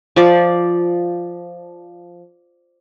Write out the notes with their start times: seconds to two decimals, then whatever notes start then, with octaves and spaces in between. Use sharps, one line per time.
0.16 F3 D5